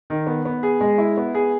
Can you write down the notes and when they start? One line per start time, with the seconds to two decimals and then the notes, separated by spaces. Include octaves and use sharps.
0.10 D#3
0.27 B3
0.45 B3
0.63 G#4
0.81 G#3
0.98 E4
1.17 B3
1.35 G#4